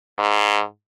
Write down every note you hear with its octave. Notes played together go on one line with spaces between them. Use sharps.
G#2